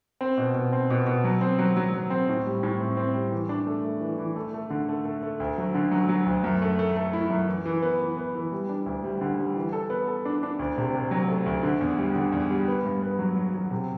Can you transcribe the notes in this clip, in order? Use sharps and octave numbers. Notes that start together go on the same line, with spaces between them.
C4
B2
B2
C4
B2
B2
F#3
C4
F#3
F#3
F#3
C4
A2
G3
A2
C4
C4
G3
E3
D4
A3
A3
E3
E3
A3
A3
D3
A3
A3
A3
D2
F#3
D3
F#3
F#3
D2
F#2
A3
A3
A3
E4
F#2
E3
E3
B3
E3
B3
E3
G3
D4
D2
G3
D3
G3
E3
A4
B3
A4
D4
D4
D2
C3
C3
F#3
A3
D2
D3
E2
G3
D3
E2
G3
B3
G2
B3
F#3
F#3
F#3
C3